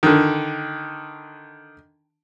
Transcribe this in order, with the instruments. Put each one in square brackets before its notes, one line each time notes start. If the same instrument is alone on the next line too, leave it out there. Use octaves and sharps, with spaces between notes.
[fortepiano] D3 D#3